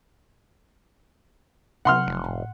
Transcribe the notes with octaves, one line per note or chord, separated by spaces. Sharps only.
C3 F#3 F#5 C6 F6
F1
A2